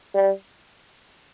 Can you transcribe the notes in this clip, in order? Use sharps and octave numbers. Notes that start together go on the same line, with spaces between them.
G3